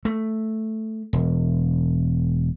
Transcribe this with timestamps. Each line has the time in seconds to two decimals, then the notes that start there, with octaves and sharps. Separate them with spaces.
0.05 A3
1.13 E1